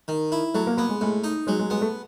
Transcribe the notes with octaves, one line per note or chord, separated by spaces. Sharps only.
D#3
E4
F#3 A3
A#3
A#3 B3
G#3
A2 G#3
D#4
F#3 G#3
G#3
G#3 B3
A3